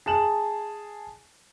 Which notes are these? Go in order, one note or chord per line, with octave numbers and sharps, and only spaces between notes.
G#4 A5 E7 F#7